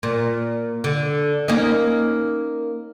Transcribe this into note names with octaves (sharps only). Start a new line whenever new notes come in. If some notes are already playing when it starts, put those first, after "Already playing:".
A#2
D3
A#3 C#4 D#4